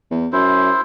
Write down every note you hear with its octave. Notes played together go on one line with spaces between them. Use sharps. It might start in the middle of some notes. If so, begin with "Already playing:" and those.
E2
F#2 E4 C5